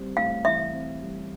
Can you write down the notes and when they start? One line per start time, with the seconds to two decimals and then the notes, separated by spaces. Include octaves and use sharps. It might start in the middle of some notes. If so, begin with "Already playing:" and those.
Already playing: G3 C4
0.17 A2 F5
0.45 E3 E5
0.73 C4
1.02 G3